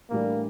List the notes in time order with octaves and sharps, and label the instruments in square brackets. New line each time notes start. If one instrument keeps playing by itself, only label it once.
[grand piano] A2 E3 G3 D4 [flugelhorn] A#3